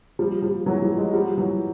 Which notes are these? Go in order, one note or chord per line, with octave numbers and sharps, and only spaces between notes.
F3 G3
F3 G3
E3 F#3
F3 G3
F#3 G#3
F3 G3
E3 F#3